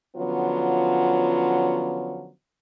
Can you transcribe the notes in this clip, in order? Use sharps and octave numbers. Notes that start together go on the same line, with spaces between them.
D3 F3 F#3 B3 C#4 F4